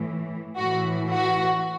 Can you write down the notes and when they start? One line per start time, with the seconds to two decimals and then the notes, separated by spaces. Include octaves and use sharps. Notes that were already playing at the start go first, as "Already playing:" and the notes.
Already playing: A2 E3
0.58 A2 E3 F#4
1.12 F#4